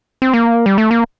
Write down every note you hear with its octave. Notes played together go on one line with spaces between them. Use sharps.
C4
A#3
G3
A3
A#3